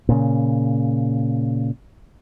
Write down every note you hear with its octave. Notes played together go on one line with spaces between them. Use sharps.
A#2 C#3